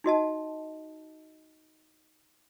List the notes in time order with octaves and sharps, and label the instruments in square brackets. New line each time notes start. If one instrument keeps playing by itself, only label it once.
[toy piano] D#4 F#4 D#5 A5